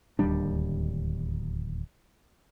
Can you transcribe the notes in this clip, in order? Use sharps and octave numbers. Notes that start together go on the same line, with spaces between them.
D1 D#2 G3 D4